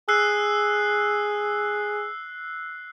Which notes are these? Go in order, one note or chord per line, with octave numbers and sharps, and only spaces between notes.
G#4 E6 F#6 C7